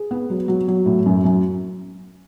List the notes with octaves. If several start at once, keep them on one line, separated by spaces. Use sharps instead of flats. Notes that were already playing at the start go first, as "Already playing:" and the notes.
Already playing: G#4
B3
F#3
F#3
F#3
A2
F#2
F#2